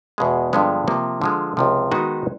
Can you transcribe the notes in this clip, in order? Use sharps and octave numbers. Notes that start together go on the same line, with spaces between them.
E2 B2 G#3
G2 D3 F3 G#3 B3
C3 F3 A#3
D3 F3 G#3
C#2 C3 F3
D#3 G#3 B3 D#4 F#4